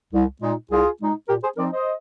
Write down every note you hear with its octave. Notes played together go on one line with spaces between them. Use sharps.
C2
A#2 G#3 D#4
C2 F4 G#4
A#2 G#3 D#4
A#2 G4 A#4
G#4 C5
F3 C4 D#4 A#4 D5
C5 D#5